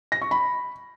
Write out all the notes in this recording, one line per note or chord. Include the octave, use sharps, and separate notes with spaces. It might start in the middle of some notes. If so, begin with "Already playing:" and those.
A#6
C#6
B5